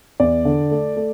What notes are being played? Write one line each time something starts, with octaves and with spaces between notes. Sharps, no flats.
E2 D5
D3
A3
A3